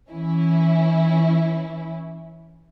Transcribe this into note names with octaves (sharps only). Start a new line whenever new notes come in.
E3 C#4 E4